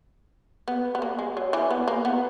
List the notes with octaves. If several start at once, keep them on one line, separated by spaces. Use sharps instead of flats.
B3
B3
A#3
G#3
F#3
E3
B3
A#3
B3